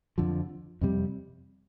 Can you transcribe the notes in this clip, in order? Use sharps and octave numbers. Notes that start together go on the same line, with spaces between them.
F2 D3 F3
F2 C3 G3